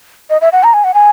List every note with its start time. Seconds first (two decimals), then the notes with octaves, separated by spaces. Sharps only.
0.30 D#5
0.41 E5
0.52 F#5
0.63 A#5
0.73 G#5
0.84 F#5
0.94 G#5